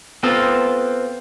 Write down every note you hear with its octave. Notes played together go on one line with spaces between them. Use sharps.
B3 C4 F4 A4